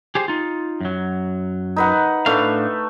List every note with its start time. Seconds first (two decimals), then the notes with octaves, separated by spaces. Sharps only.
0.15 G4 G#4 C5
0.28 D#4 F4
0.80 F#2 F#3
1.76 D#4 B4 F#5
2.26 A2 A3 D4 B4 F5